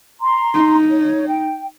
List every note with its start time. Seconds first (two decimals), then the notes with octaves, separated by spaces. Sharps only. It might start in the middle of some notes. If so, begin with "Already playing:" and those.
0.21 A#5 C6
0.54 D#4
0.90 C#5
1.27 G5